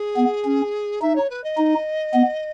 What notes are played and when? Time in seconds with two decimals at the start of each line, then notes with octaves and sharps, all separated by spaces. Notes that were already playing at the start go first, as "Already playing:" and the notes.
Already playing: G#4
0.17 B3
0.45 C#4
1.01 D#4 E5
1.15 C#5
1.29 B4
1.43 D#5
1.58 D#4
2.14 B3